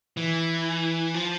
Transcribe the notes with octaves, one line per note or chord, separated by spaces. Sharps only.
E3
F3